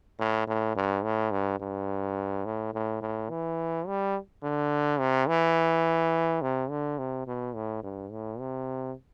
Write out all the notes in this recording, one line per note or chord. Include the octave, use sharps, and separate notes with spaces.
A2
A2
G2
A2
G2
G2
A2
A2
A2
E3
G3
D3
C3
E3
C3
D3
C3
B2
A2
G2
A2
C3